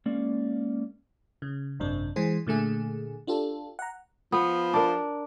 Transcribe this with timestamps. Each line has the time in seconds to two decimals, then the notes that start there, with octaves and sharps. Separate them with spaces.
0.06 G#3 A#3 C#4 D5 F5
1.42 C#3
1.80 G#1 F#2 C3 D4
2.16 E3 G#3 G#4 C5
2.46 A#2 D3 A3 G#4
3.27 D4 F4 G4 A4
3.79 F#5 A#5
4.32 F3 B3
4.74 D4 A#4